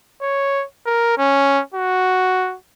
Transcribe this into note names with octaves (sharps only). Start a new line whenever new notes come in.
C#5
A#4
C#4
F#4